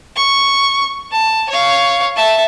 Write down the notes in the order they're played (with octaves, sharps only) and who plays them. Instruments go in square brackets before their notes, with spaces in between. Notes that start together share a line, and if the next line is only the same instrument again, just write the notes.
[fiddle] C#6
A5
C#5 F5
E5 A5